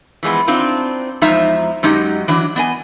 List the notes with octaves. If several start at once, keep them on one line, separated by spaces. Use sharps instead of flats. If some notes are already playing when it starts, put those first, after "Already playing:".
E3 F3 G#3 B3
C4 D4 D#4 F4
E2 F3 G#3 D#4 E5 A#5
F#2 G#3 D#4 G4 D#5
E3 F#3 D4
B3 D#5 G#5